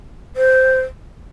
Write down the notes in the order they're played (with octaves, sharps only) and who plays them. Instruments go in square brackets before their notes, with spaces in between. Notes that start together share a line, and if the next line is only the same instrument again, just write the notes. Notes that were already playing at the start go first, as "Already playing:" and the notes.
[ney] C5